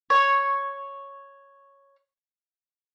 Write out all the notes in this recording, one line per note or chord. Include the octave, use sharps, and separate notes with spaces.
C#5 C#6